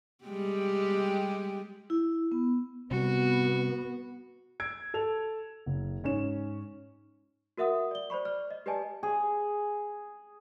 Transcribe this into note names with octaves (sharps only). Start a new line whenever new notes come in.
G3 G#3 G4
E4
B3
C3 G3 B3 F#4
E6 G#6 D7
A4 F7
F#1
G#2 C#4 C#5 E7
F#4 A#4 E5 F#5 D#6
D5 G7
C5 D5 B5 C#6
D5 F6
D#5
G4 B4 D5 D#5 G#5 A5
G#4